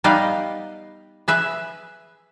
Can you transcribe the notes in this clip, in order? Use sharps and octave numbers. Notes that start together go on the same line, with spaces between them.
G3 B3 D#4 B4 D#5 F5
G#4 B4 E5